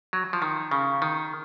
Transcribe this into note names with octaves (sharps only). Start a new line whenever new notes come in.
F#3
F3
D#3
C#3
D#3